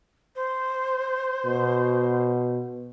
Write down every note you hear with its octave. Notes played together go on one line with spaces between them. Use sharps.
C5
B2